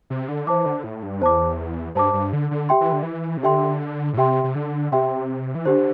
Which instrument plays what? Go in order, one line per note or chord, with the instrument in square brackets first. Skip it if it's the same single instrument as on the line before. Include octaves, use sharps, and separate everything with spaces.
[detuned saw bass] C3
D3
[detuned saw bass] E3 [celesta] C5 A5 D6
[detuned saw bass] D3
A2
G2
[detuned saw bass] E2 [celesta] C5 A5 D6
[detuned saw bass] G2 [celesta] C5 A5 D6
[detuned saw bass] G2
D3
D3
[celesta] G4 E5 G5 C6
[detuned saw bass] E3
D3
E3
C3
[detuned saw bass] D3 [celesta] G4 E5 G5 C6
[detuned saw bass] A2
[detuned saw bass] C3 [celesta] G4 E5 G5 C6
[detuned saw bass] C3
D3
[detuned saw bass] C3 [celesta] G4 E5 G5 C6
[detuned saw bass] E3
[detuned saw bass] D3 [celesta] D4 G4 C5